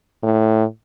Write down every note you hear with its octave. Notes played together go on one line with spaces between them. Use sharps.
A2